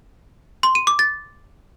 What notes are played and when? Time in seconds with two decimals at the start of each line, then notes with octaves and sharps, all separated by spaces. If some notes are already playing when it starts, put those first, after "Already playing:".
0.63 C6
0.75 D#7
0.87 D6
0.99 A6